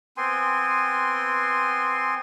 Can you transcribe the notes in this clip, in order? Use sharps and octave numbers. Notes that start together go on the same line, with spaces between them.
B3 C4 G#5 C6